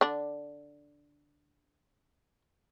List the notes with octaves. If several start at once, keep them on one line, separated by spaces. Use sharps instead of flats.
D3 D4